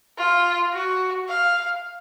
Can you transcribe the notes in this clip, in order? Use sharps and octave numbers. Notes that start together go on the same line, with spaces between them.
F4
F#4
F5